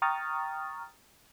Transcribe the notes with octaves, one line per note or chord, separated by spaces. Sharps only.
G5 A#5 C#6 D#6 F6 A6